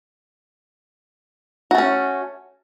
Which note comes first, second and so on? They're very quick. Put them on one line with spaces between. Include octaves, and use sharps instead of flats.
F#4 A3 C#4